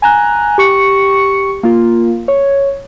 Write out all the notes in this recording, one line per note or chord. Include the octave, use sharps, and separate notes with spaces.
G#5 A#5 F#6
G4 C#6 C#7
A#3 F4
C#5